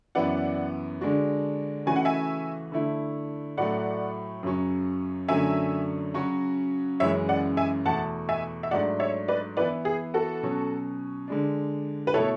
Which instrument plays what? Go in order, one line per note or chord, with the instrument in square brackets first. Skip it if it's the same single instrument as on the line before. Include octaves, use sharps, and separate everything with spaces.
[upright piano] F#2 E3 B3 E4 [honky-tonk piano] D5 F#5
[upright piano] D3 G#3 D4 F#4
[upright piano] C#3 E3 A3 C#4 F#4 [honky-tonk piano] G#5
[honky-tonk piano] F#5
E5 G#5
[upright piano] D3 A3 E4
[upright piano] A2 F#3 A3 [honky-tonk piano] D5 F#5
[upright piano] F#2 C#3 F#3 C#4
[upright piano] F#2 D3 F#3 A3 [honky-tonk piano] E5 G#5
[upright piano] C#3 F#3 C#4 F#4
[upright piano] F#2 C#3 E3 G#3 [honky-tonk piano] C#5 E5
[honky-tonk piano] D5 F#5
E5 G#5
[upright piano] E2 B2 A3 [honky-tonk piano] F#5 A5
[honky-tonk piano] E5 G#5
E5
[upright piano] G#2 F#3 A3 D4 [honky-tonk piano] D5 F#5
[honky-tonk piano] C#5 E5
B4 D5
[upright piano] E3 B3 E4 [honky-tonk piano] B4 D5
[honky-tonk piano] G#4
F#4 A4
[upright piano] B2 F#3 C#4
D3 G#3 D4
[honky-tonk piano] B4
[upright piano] B2 A3 E4 [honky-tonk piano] A4 C#5